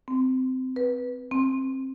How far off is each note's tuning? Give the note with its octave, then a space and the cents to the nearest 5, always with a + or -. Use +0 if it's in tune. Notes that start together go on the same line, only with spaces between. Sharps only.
C4 -20
B4 -10
C4 +20